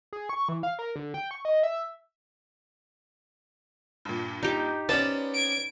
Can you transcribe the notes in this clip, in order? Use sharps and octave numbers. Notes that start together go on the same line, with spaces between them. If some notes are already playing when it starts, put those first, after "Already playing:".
G#4
C#6
E3
F5
A#4
D3
G5
C#6
D#5
E5
G2 A#2
D#4 G4
B3 C#4 B4 C5 D5 A5
G#6 D7